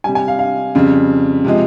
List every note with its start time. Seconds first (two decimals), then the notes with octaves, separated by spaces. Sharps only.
0.04 C3 G3 G#5
0.15 G#5
0.28 F5
0.39 F5
0.75 F2 C#3 G3
1.45 C3 F3 G#3